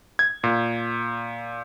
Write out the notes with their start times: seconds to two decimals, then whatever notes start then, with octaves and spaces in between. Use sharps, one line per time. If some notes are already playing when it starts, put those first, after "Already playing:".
0.19 G#6
0.44 A#2